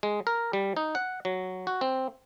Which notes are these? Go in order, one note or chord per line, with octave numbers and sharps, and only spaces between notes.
G#3
A#4
G3
D#4
F#5
F#3
F#4
C4